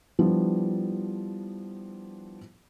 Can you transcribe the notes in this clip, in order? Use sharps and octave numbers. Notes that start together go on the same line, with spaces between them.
F3 G3 B3 D4 E4